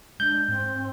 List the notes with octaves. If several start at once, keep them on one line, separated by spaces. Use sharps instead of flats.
G#3 D4 G6
G#2 C4